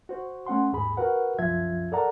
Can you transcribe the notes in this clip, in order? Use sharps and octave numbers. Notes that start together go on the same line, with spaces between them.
F#4 C5
A3 C#4 F#5 C6
D#2 G#2 G#4 B5
F#4 A#4 B4 F#5
C2 F#2 F3 F4 E5 G#6
A4 A#4 D5 F#5 A#5